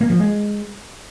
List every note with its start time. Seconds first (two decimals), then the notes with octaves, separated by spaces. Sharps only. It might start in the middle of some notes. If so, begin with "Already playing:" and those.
0.01 A#3
0.10 F3
0.19 G#3